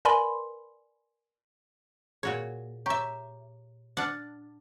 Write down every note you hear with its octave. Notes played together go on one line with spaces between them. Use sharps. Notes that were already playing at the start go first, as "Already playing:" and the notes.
A#4 B4 D5 G#5 B5 C6
A#2 F#4 G#4 C#5
G4 C#5 E5 A#5 C#6
D4 F#5 D6 F6